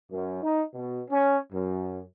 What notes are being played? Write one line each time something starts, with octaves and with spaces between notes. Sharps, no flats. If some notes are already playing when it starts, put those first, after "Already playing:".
F#2
D#4
B2
C#4
F#2